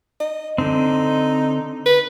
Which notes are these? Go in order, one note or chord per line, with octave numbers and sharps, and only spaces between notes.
D#5
D3 C4 D#4
B4